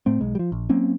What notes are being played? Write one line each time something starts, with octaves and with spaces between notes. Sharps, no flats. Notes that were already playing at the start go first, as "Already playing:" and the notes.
A2 A3 C4
B1 G#3
F3 G3
A#1
F#3 A#3 C4 C#4